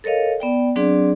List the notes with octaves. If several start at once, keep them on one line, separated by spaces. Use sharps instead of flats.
A4 A#4 C#5 D#5 F5
B3 D5 G5
F#3 C4 D4 G#4 D5